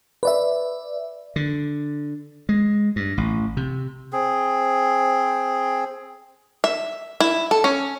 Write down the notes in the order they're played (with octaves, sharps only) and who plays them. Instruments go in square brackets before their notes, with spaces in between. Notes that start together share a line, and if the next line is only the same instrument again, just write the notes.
[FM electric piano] B4 D5 E5
[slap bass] D3
G#3
G2
A1
C3
[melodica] C4 G#4
[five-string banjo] E5
E4
A4
C#4